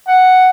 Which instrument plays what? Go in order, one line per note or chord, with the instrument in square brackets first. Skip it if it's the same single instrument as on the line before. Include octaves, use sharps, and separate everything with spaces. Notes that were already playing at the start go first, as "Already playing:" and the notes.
[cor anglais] F#5